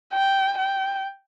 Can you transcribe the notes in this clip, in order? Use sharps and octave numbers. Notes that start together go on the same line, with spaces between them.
G5
G5